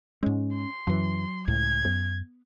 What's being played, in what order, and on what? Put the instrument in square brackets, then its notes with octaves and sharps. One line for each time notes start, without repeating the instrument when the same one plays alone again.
[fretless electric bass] G#2 G#3 [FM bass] C#4
[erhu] C6
[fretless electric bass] F#2 E3 [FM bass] F#3
[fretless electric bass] C#2 A2 [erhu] G#6
[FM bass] F#2 [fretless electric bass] B3